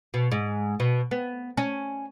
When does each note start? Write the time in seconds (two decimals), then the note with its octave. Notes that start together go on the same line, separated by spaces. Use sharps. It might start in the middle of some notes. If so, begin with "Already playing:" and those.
0.14 B2
0.32 G#2
0.80 B2
1.11 B3
1.57 C#4